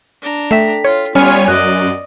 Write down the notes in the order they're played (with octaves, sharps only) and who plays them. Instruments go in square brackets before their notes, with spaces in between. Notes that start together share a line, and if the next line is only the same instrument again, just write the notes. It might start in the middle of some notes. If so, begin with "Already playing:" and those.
[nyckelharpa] D4 A#5
[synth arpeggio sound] A3 E5 E7 [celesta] A4 G5 B6
[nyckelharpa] F4 [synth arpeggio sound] C#5
[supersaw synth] G3 C#5 G#5 [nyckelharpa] B3 F4 [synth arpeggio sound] C#4 [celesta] F6
[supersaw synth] F#2 [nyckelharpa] D5 D#5 [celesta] F#6